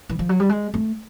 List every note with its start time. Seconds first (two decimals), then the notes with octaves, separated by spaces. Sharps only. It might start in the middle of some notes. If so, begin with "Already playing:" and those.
0.09 E3
0.19 F3
0.29 F#3
0.40 G3
0.49 G#3
0.74 A3